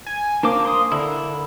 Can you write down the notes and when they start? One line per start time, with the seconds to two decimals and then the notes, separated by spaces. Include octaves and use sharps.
0.06 G#5
0.43 A#3 D4 C5 D6
0.65 C6 D#6
0.92 D3 E4 A#4